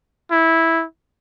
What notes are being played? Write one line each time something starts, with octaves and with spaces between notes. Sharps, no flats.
E4